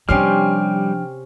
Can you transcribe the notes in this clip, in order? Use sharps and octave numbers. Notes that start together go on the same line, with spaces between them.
C3 F3 G3 C#4 D4 G5 C6 F6